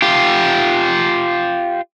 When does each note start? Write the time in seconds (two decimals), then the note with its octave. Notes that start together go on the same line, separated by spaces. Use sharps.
0.02 F4 G4